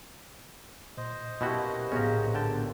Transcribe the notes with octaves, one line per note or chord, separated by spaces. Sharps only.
A#2 C5 D#5
B2 A#3 C#4 E4 F#4 G4
A#1 A2 B3 C#4 F#4 G#4 A#4
D3 G5 A5